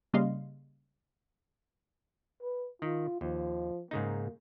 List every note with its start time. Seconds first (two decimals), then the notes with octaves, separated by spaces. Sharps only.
0.13 C#3 G3 A#3 D#5 F5 C6
2.42 B4
2.82 D#3 F4
3.21 D#2 F3
3.91 G#2 C#3 A#3 D#4